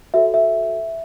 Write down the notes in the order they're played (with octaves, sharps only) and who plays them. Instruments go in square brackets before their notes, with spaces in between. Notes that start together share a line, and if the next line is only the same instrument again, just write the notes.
[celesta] F#4 A4 C#5 E5
E5